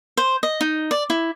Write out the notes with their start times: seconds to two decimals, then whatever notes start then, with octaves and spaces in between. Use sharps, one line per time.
0.17 C5
0.43 D#5
0.61 D#4
0.91 D5
1.10 E4